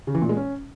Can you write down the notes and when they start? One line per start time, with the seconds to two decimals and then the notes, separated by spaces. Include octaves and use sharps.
0.07 C#3
0.15 E3
0.22 A#2
0.29 G#3
0.37 C#4